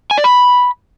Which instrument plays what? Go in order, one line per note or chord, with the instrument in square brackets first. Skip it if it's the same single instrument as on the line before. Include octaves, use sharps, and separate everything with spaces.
[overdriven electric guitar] G#5
D5
B5